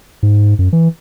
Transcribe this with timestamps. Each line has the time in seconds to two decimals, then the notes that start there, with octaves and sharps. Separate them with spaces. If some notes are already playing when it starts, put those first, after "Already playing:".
0.23 G#2
0.59 F#2
0.73 E3